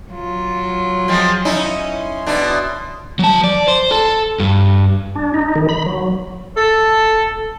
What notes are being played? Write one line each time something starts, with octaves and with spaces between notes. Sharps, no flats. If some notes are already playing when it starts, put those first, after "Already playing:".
F#3 F4
F3 G#3 C4
C#4 D#4 E4
C6
B2 D4 E4
F#3 A5
D5
C5
A4
G2
D4
D#4
D#3
B5
F#3
A4